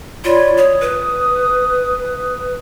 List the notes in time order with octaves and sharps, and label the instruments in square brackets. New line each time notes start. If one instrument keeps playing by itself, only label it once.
[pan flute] F4 [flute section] C#5 D5 B5
[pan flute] C#5 [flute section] D#6
[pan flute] B4